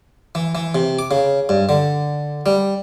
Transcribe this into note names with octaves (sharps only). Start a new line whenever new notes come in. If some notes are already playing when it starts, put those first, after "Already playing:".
E3
E3
C3
D6
C#3
G2
D3
G3